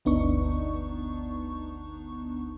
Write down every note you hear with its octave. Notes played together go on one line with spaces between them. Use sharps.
G1 D2 B3 D4 D#4 C#6